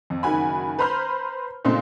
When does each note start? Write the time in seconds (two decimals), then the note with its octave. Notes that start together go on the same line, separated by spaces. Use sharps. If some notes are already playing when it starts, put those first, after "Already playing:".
0.10 F2
0.23 F#1 D#3 F#4 G#5 B5
0.79 B4 C5 A#5 B5 F6 G6
1.65 A#2 C#3 A3 C4 D#4